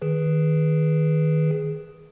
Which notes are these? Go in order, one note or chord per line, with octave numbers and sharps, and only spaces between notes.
D#3 G#4 B4